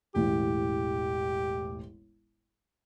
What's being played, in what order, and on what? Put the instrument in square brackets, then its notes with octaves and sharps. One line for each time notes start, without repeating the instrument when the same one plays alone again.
[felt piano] E1 A1 A2 [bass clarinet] G4